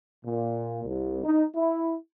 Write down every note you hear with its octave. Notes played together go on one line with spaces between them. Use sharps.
A#2
C2
D#4
E4